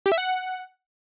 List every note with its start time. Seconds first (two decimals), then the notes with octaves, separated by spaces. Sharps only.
0.06 G4
0.12 E5
0.18 F#5